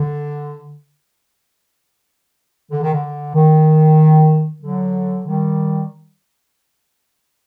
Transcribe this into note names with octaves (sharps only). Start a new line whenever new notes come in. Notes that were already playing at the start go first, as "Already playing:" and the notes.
Already playing: D3
D3
D#3
D3
D#3
D3 F#3
D#3 G3